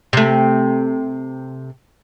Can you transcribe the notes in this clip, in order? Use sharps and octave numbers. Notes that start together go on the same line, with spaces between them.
C3 A3